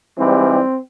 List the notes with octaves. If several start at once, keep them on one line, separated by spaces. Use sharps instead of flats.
G#2 E3 G3 C4